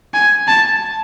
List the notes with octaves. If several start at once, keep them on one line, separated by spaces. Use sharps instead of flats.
G#5
A5